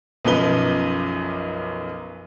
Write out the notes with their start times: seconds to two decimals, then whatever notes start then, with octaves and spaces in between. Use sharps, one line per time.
0.25 B1 F#2 F3 D#4 B4 G7